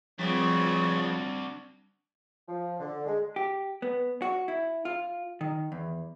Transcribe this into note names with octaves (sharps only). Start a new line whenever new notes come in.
C#3 F3 G3 C4 D4 F#4
F3
D3
G#3
G4
B3
F#4
E4
F4
D#3
E2